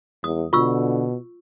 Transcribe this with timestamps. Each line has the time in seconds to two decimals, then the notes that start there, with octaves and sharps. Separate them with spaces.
0.24 E2 D#6
0.53 B2 D3 F4 C#6 E6